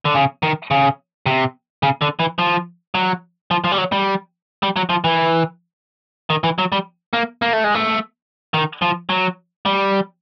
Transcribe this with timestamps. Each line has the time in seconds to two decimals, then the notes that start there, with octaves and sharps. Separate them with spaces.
0.05 D3
0.15 C#3
0.43 D#3
0.71 C#3
1.26 C3
1.83 C#3
2.02 D3
2.20 E3
2.39 F3
2.95 F#3
3.51 F3
3.64 F3
3.72 G3
3.78 F#3
3.92 G3
4.63 G3
4.76 F#3
4.90 F3
5.04 E3
6.30 D#3
6.44 E3
6.59 F#3
6.72 G3
7.13 A#3
7.42 A#3
7.53 A3
7.64 G#3
7.75 A3
8.54 D#3
8.82 F3
9.09 F#3
9.66 G3